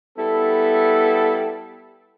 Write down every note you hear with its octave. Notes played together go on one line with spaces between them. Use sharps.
G3 B3 E4 A4